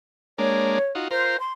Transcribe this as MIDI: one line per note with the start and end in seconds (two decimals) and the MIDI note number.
0.38 0.79 56
0.38 0.79 58
0.38 0.79 62
0.38 0.91 73
0.95 1.08 63
0.95 1.08 65
0.95 1.08 66
1.11 1.37 65
1.11 1.37 70
1.11 1.37 72
1.11 1.37 84
1.40 1.53 84